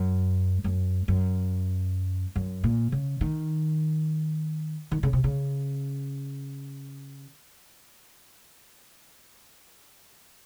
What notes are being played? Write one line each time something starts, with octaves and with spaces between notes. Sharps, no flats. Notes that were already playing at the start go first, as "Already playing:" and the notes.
Already playing: F#2
F#2
F#2
F#2
A#2
C#3
D#3
D#3
C#3
C3
C#3